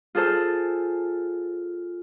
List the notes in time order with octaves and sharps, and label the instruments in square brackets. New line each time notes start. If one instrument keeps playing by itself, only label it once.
[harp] F4 G#4 A4 C5